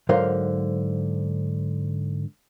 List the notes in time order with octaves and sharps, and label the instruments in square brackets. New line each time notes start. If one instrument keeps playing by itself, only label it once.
[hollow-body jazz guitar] G#2 D3 F#3 A#4 C5 F5